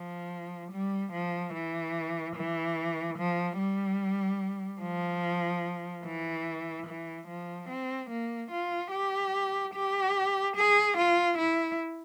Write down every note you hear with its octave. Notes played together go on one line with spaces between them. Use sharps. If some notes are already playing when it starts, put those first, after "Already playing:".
Already playing: F3
G3
F3
E3
E3
F3
G3
F3
E3
E3
F3
C4
A#3
F4
G4
G4
G#4
F4
E4